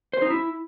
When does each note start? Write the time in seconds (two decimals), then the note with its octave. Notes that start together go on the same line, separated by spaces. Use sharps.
0.13 C5
0.22 D#4
0.30 E4